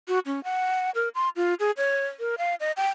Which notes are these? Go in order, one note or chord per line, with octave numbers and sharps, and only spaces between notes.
F#4
C#4
F#5
A#4
C6
F4
G#4
C#5
A#4
F5
D#5
G5